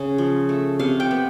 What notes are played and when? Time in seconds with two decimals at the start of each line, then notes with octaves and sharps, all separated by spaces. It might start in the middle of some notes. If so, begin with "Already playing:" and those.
Already playing: C#3
0.18 F3
0.49 A3
0.80 C3 F5
1.00 G5
1.11 B3